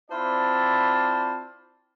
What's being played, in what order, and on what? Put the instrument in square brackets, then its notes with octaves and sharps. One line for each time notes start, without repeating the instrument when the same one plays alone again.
[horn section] C4 E4 F4 C5 D5 A5